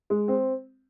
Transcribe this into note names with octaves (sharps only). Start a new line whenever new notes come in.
G#3
C4